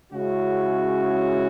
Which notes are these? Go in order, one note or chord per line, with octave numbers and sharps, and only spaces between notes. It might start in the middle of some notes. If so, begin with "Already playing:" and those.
C#3 G#3 C#4 E4 F#4